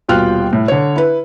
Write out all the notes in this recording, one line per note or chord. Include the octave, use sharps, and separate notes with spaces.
D#1 B2 F4 G5 F6 F#6
A2
D3 C#5
E4 B4